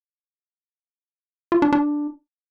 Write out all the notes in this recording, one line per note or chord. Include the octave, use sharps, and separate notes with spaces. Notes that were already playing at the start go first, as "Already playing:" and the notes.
F4
D4
D4